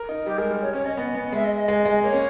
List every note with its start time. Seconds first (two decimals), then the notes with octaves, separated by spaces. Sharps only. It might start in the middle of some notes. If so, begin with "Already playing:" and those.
Already playing: A#4
0.09 D#4
0.26 G3 G4
0.38 G#3 A#4
0.50 G3
0.62 C#5
0.73 C#4 C#5
0.85 C#4 D#5
0.97 B3 D#5
1.15 B3
1.33 G#3 E5
1.44 D#5
1.56 E5
1.60 D#5
1.68 G#3
1.85 G#3
2.03 A#3 C#5
2.13 C#4